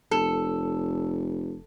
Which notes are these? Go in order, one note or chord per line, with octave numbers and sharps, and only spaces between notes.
F1 A4